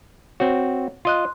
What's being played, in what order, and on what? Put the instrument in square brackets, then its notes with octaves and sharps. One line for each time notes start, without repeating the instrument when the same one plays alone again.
[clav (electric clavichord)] C4 F#4 [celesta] C#5
[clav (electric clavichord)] F4 D#5 [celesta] C6 F#6